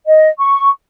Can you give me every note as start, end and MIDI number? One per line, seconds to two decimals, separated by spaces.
0.06 0.28 75
0.39 0.69 85